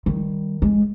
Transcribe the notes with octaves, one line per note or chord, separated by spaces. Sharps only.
D#3 G3
G#3